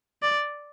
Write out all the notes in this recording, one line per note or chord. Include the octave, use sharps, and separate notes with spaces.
D5